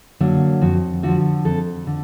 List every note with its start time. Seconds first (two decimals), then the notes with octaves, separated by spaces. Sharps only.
0.20 D3 F#3 A#3
0.61 F2 F#4
1.03 D3 F3 F#4
1.45 F2 A4
1.87 D3